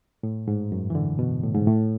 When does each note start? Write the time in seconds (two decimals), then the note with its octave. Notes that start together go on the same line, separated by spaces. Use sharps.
0.23 A2
0.48 G#2
0.72 F#2
0.90 E3
0.95 D3
1.19 B2
1.43 A2
1.54 G#2
1.67 A2